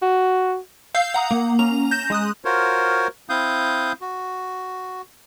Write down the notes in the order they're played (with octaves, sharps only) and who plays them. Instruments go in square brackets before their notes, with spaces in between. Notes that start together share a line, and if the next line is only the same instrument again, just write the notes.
[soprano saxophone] F#4
[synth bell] F5 E6 G6 C7
F#5 A#5 D#6
A#3
C#4 A#5 F7
G6 A#6 E7
G#3 D#6 F#6
[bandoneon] F4 F#4 A#4 C5 C#5
C4 E4 F5 D#6 G6
F#4